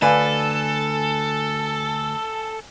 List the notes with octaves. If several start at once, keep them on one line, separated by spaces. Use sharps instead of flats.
D2 A4 B4 D5 F5 G#5